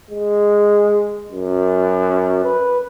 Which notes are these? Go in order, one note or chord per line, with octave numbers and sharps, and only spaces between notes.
G#3
F#2
B4